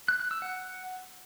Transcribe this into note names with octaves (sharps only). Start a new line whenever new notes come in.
F#6
F#6
E6
F#5